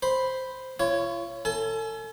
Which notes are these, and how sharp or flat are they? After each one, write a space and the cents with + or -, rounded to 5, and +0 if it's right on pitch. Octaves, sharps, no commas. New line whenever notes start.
C5 +0 B5 +0
F4 -40 C#5 +0
A4 +30 G#5 +40